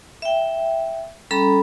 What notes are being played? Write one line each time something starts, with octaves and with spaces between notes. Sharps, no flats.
E5 G5
G3 C#4 A4 A#5 B5